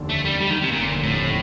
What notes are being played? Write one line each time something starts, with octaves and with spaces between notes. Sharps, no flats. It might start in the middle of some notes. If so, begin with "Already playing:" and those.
Already playing: F1 D#2 D3
A3
G3
G3
D#3
C3
F1 D#2 A#2 D3
A2